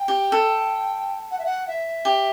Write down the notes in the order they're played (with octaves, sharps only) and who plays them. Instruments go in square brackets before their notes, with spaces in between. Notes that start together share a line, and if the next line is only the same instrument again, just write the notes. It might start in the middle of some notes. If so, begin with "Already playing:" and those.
Already playing: [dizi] G5
[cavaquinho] G4
A4
[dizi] F#5
E5
F#5
E5
[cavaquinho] G4